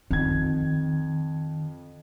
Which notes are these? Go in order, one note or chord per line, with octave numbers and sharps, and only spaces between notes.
F2 D#3 G#6